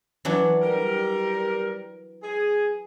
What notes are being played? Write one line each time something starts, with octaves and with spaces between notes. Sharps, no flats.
E3 F#3 D4
G3 A#4
G#4